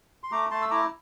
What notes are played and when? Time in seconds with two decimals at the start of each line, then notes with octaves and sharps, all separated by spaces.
0.23 C6
0.32 A3 A#5 D6
0.51 A3 A5 C6
0.62 E6
0.70 E4 A#5 D6